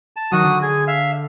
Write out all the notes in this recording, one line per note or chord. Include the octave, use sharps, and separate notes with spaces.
A5
D#3 F#3 F#4 D#6
D3
G#4
E5 F5